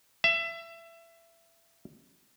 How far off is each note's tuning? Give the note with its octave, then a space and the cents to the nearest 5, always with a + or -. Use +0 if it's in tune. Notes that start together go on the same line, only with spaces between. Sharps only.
E5 +25